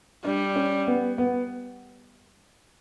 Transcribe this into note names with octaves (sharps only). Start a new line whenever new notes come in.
G3 D4
C#4
B3
B3